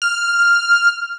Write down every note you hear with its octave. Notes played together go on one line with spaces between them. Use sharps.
F6